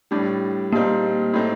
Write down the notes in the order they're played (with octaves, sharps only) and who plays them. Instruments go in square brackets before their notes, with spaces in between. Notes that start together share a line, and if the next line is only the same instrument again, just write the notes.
[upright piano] A2 G3 D4
[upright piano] A#2 G3 C4 D#4 [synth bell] A#3
[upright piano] A2 A3 C4 D#4